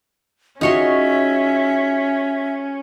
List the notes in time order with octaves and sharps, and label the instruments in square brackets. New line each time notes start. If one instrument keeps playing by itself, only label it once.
[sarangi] C#4 [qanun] D#4 C#5 C6 [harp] F4 F#4 G#4 [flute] E5